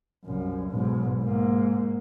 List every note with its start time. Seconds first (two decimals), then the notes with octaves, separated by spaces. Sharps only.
0.24 C2 F#2
0.70 B1 G#2
1.22 G#2 A#3